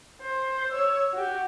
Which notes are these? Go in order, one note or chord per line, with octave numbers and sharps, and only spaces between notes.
C5
C#5 E6
F#4 G4